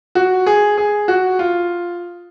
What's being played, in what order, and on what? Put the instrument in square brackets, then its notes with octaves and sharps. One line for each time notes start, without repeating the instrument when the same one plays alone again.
[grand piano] F#4
G#4
G#4
F#4
F4